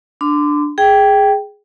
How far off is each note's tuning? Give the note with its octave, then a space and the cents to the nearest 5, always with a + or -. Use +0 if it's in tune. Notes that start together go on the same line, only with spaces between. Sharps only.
D4 +5 C6 -35
G#4 +0 G5 +0